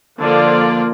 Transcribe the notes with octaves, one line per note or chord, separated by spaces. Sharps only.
D3 F3 A#3 F4 D5